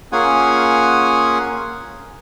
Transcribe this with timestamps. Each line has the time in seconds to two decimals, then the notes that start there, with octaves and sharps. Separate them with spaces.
0.12 A#3 C#4 F4 G#4 F#5 G#5